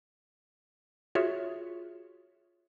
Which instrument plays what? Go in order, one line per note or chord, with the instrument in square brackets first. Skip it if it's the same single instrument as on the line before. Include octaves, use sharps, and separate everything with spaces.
[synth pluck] F4 F#4 G#4 C#5 E5